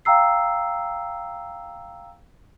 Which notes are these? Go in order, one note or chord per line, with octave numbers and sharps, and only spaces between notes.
F5 G5 A#5 E6 C7